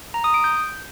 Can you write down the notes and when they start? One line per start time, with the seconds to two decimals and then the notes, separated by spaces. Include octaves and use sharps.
0.14 A#5
0.24 D#6
0.34 D7
0.44 G6